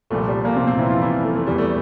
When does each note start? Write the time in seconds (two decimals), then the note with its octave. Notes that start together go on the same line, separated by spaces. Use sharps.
0.10 C2 A#2 F3 A3
0.28 G3
0.45 A#2 A#3
0.56 C3 C4
0.67 C3 C4
0.79 E3 E4
0.90 F3 F4
1.01 E3 E4
1.24 A3
1.35 A3
1.47 E2 E3 G3
1.58 A3